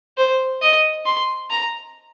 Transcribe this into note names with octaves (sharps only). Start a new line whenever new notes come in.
C5
D#5
C6
A#5